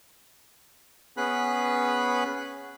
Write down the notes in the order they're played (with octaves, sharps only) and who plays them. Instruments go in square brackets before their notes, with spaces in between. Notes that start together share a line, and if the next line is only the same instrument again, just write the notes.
[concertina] B3 C#4 G#4 B4 B5 F#6